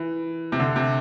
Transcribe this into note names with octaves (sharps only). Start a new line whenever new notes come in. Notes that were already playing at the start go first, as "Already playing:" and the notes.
Already playing: E3
C3
D3
C3